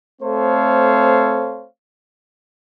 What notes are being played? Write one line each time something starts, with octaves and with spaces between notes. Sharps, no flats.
A3 C4 A4 C5 C#5 F5